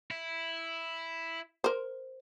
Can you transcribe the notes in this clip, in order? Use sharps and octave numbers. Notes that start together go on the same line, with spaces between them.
E4
A#4 C5